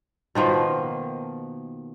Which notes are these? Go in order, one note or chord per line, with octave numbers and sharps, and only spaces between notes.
B2 D#3 F3 A#3